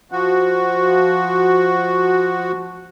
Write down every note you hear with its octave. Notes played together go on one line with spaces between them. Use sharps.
F3 F#4